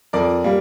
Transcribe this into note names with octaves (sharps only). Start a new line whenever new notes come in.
F2 A#4 D5
G3 A#3